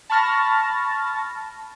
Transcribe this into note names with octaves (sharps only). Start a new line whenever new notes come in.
A5 B5 C#6 F6 A6 A#6